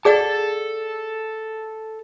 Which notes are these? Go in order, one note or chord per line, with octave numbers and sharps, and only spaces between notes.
G#4 A4 D5 F#5 A5